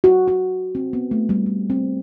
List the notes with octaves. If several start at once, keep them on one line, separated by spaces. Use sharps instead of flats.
F#4
F#4
C4
B3
A3
G3
A3
C4